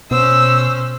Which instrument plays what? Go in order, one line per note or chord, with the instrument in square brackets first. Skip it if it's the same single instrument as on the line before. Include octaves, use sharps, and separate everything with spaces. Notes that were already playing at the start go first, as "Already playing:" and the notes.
[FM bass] B2 [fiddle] C#4 C5 [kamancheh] E6